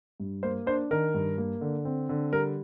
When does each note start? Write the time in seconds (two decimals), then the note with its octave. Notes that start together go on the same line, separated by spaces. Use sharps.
0.20 G2
0.43 A#3 C5
0.66 D4 C5
0.91 D#3 A#4
1.14 G2
1.38 A#3
1.61 D3
1.85 C4
2.09 D3
2.32 G3 A#4